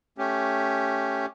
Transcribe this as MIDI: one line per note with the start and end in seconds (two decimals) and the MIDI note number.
0.18 1.26 57
0.18 1.26 61
0.18 1.26 67